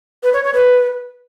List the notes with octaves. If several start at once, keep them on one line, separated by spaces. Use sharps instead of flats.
B4
C#5
C#5
B4